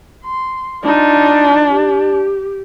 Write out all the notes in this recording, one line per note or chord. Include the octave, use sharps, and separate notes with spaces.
C6
D4 D#4 F4
G4